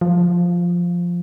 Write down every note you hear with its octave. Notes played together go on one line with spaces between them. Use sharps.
F3